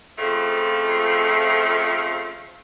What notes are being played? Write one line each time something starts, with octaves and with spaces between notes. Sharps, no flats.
F2 C#3 F3 A3